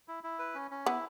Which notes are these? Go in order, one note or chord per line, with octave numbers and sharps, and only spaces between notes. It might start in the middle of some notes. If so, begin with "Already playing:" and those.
E4
E4
B4
C#4
C#4
B3 E4